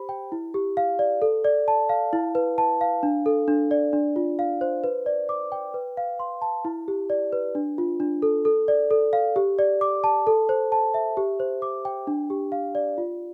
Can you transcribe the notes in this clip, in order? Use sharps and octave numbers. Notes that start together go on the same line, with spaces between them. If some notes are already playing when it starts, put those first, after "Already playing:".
Already playing: G4 C5 B5
G5
E4
G4
F5
D5
A4
D5
A5
F5
E4
B4
A5
F5
D4
A4
D4
D5
D4
F4
F5
C5
B4
D5
D6
G5
B4
F5
C6
A5
E4
G4
D5
B4
D4
F4
D4
A4
A4
D5
A4
F5
G4
D5
D6
A5
A4
C5
A5
E5
G4
C5
D6
G5
D4
G4
F5
D5
F4